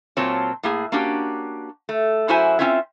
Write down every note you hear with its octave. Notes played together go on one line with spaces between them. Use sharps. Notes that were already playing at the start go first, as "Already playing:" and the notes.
A#2 F#3 C4 F4 C#5 A5
A2 A#3 G#4
A#3 C#4 D4 F#4 G4
A3
F#2 E4 F#4 C5 E5 G#5
C4 C#4 F4 C5 E5